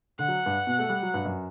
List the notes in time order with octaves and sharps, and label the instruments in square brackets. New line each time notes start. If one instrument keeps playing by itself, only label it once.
[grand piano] D3 [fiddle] F#5
[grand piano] F#3
G2
B2
A3
G3
F#3
G2
F#2